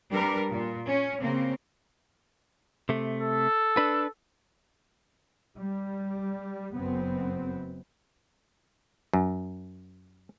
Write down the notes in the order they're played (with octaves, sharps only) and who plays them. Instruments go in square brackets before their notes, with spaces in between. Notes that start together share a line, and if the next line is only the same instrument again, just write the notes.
[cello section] G3 D4 A#4 B4
A#2
C#4
C#3 A#3 C4
[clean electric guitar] C3 A3
[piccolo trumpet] A4
[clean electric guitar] D4 B4
[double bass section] G3
F#1 F#2 B3 C4
[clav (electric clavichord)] F#2